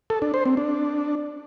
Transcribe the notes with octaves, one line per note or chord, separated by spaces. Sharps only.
A4
D4
C5
C4
D4